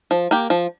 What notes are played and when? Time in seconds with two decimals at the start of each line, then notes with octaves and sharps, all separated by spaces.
0.11 F3
0.31 A#3 G4
0.50 F3